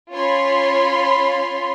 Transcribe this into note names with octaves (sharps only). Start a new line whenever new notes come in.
C#4 F4 C#5 B5 C6